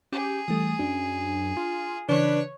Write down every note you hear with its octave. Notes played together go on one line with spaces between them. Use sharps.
C#4 G4 G#4
E3 G3 A3 D#6
F#2 D4
F4
C#3 E3 D4 B4 C#5 C#6